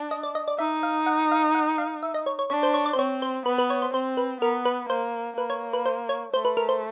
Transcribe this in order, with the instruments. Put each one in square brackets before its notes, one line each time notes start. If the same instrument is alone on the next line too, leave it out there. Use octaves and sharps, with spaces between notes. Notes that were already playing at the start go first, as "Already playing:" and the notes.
Already playing: [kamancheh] D4
[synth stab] D#5
D5
D#5
D5
[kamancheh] D#4 [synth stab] E5
[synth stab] F5
F#5
F5
F#5
F5
E5
D#5
C#5
C#5
[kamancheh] D4 [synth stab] C#5
[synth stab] C5
C#5
D5
C5
[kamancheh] C4 [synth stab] C#5
[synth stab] C5
[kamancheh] B3 [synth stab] B4
[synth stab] B4
C#5
C5
[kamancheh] C4 [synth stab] C5
[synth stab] B4
[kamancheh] B3 [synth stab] A#4
[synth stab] B4
[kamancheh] A#3 [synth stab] C5
[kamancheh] A#3 [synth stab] B4
[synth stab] C#5
B4
C5
C#5
[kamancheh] A3 [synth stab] C5
[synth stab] B4
A#4
C5